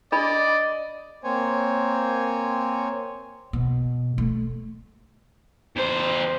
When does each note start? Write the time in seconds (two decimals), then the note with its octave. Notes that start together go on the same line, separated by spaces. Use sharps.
0.12 D4 G#4 D5 D#5 B5
1.24 A#3 C4 C5 C#5 G#5
3.53 B2
4.18 A3
5.76 E2 C5